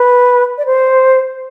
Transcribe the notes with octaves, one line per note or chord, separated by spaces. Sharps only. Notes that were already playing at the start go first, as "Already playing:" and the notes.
Already playing: B4
D5
C5